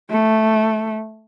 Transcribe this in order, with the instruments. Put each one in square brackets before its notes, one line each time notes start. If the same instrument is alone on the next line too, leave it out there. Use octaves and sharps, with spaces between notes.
[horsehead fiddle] A3